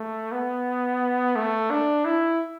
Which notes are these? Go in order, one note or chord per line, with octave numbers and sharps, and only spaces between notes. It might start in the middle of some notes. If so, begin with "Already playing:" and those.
Already playing: A3
B3
A3
D4
E4